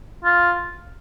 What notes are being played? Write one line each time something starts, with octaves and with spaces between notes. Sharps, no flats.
F4